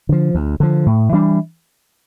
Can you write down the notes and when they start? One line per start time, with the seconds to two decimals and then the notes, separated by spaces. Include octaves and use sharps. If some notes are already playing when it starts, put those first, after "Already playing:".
0.09 D3 F3
0.35 D2
0.60 D3 F3
0.86 A2
1.12 E3 G3 D4